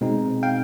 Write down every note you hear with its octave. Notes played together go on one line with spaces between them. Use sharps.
B2 G#3 C4 D#4
F5 G5